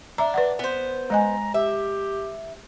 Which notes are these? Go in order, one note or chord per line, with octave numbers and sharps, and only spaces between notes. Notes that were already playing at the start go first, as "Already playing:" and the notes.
D4 E5 A#5
B4 D5 F#5
B3 C5
G#3 D#5 G#5 A#5
G4 E5